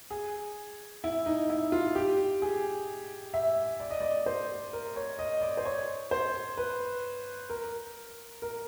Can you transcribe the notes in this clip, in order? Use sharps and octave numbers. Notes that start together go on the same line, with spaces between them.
G#4
E4
D#4
E4
F4
G4
G#4
E5
D5
D#5
D5
C5
A#4
C#5
D#5
D5
C5
C#5
C5
B4
A#4
A#4